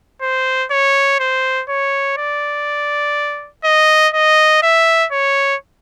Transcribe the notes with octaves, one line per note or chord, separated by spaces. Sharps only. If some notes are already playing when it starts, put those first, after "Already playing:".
C5
C#5
C5
C#5
D5
D#5
D#5
E5
C#5